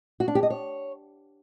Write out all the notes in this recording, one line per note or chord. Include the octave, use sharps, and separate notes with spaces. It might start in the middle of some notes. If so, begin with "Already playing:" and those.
F#4
D4
G4
D#5
C#5